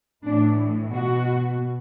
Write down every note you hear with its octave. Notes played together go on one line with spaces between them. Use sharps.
A2 E3 D4
B2 F#4